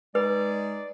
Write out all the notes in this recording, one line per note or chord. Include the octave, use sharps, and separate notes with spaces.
G#3 D#4 B4 D5